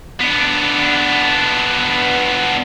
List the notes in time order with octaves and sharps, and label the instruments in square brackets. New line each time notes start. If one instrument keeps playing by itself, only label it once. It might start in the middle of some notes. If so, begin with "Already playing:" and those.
[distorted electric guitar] B3 D4